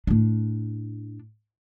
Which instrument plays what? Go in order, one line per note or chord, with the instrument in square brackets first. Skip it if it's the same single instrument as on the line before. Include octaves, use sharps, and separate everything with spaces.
[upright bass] A2 D4